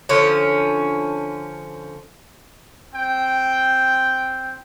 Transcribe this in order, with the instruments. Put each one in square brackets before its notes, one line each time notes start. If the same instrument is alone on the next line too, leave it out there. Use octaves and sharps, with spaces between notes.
[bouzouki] D3 F3 C#4
[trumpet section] C4 G5